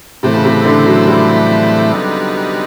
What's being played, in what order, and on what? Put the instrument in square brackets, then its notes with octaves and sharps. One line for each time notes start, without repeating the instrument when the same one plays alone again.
[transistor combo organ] A2 E3 A3 C4 E4 [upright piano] C3
[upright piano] C#3
C3
D3
F#3
G3
[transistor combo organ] G3 B3 D#4